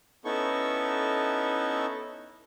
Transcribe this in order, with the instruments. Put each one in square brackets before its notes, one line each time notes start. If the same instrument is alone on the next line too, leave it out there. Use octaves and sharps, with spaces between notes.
[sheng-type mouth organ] B3 C#4 D#4 E4 A4 C#6